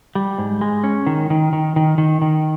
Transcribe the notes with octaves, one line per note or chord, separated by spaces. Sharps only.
G3
G#2
G#3
C#4
D#3
D#3
D#3
D#3
D#3
D#3